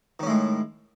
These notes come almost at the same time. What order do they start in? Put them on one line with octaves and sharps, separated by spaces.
D#3 C#4 A2 G#3